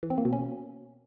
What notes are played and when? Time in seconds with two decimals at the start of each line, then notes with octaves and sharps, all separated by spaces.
0.03 E3
0.10 C4
0.18 A#3
0.25 B2
0.33 C#4